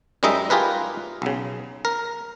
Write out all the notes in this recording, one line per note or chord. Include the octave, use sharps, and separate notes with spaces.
F#2 G3 G#3 D#4 D#5 E5
F4 G4 G#4 A#4 B4
B1 C#3
A#4